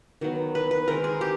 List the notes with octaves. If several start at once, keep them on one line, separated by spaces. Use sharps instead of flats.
D#3 F#3 B3
B4
B4
D#3 G#3 C4 A#4
G#4
G4